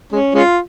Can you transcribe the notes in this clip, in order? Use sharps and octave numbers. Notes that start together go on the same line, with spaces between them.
G#3 C#4
G#3 C#4 F4